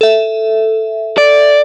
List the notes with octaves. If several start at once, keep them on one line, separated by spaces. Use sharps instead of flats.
A4 E5
D5